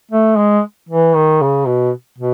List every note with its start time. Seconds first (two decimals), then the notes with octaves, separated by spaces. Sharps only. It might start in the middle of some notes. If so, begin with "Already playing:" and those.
0.11 A3
0.37 G#3
0.89 E3
1.15 D#3
1.41 C#3
1.67 B2
2.19 B2